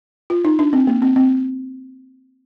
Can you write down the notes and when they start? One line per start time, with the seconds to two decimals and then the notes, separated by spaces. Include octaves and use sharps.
0.30 F4
0.45 D#4
0.59 D4
0.73 C4
0.87 A#3
1.02 C4
1.16 C4